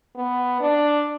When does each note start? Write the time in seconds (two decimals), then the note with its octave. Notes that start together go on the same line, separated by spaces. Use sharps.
0.16 B3
0.60 D4